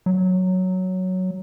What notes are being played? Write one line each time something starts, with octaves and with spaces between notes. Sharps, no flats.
F#3